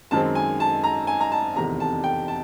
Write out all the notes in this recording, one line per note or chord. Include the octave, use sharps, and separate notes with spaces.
F#2 D#3 G#3 C4 A5
G#5
A5
A#5
G#5
A#5
A5
F1 E2 C3 D#3 A#5
A5
G5
A5